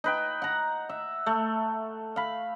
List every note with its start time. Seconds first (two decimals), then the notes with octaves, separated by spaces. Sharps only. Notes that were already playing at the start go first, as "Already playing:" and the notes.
0.04 D#4 B4 G5
0.42 F#5 A#5
0.89 E5
1.26 A3
2.16 F5 B5